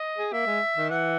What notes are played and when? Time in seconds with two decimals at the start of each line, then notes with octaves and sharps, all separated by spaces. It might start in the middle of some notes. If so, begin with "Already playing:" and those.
Already playing: D#5
0.18 G#4
0.33 A#3 E5
0.47 G#3
0.76 D#3
0.90 E3 F#5